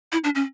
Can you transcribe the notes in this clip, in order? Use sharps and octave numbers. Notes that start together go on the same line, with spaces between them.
E4
D4
C#4